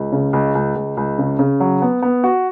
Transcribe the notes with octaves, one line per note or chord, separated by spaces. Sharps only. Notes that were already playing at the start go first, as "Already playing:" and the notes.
Already playing: C#2
C#3
C#2
C#2
C#2
C#2
C#3
C#3
F#3
B3
B3
F#4